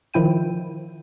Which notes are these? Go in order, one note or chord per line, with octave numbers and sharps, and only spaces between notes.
D#3 F3 E4 G5 D#7